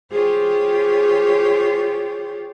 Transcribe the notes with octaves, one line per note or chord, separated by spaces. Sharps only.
F4 G4 G#4 C5 C#5